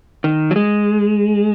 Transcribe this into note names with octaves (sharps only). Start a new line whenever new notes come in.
D#3
F#3
G#3